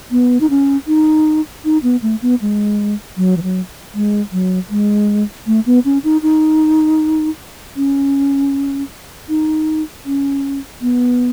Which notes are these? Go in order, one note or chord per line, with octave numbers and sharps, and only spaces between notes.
B3
D#4
C#4
D#4
D#4
B3
A3
B3
G#3
F#3
E3
F#3
G#3
F#3
G#3
A3
B3
C#4
D#4
D#4
C#4
D#4
C#4
B3